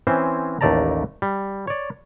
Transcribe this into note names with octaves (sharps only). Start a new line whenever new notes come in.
E3 C4 C#4 C5
A1 D#2 A3 D5 A5 A#5
G3
C#5 D5